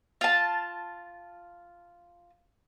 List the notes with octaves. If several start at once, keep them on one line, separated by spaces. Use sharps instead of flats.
F4 A5